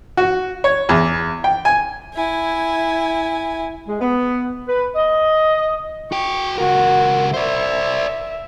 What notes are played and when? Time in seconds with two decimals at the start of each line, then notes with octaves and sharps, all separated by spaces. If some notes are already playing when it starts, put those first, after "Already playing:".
0.17 F#4
0.64 C#5
0.89 E2
1.44 G5
1.65 G#5
2.14 E4 G#5
3.88 G#3
4.01 B3
4.68 B4
4.96 D#5
6.12 F#4 G5 C#6
6.58 C#2 F#4 A#4
7.34 C5 D5 E5